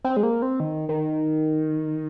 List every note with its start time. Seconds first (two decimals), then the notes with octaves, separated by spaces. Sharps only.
0.05 C4
0.17 G#3
0.23 A#3
0.42 C4
0.60 D#3
0.89 D#3